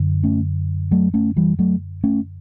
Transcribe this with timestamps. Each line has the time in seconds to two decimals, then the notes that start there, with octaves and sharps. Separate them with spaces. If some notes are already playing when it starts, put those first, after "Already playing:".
Already playing: F#2 D3
0.24 A3 C#4
0.91 F#3 A3
1.14 A3 C#4
1.37 E3 G3
1.59 F#3 A3
2.04 A3 C#4